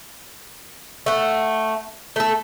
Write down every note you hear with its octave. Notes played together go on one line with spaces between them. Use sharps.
A3 F#5
A3 A4